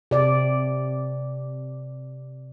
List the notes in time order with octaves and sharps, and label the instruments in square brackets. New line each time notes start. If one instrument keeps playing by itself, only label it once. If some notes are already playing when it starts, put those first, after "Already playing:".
[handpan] C3 D5